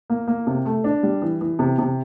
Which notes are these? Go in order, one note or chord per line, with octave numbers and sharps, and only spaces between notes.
A#3
A#3
C3
A3
D4
G3
E3
E3
C3
C3